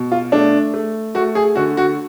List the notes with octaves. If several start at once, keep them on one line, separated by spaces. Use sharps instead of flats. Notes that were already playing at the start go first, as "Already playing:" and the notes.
Already playing: B2
F4
A3 D4
A3
A3 F#4
G#4
D3 F#4
F#4